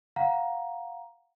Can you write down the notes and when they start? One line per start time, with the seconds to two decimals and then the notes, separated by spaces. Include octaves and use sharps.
0.16 F5 F#5 A#5